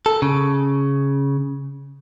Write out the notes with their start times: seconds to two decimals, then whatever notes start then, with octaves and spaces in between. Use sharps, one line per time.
0.06 A4
0.22 C#3